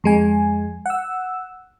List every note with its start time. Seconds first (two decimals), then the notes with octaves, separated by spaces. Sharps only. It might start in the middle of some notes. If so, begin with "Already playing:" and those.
0.04 F2 G#3 G#5
0.86 F#5 E6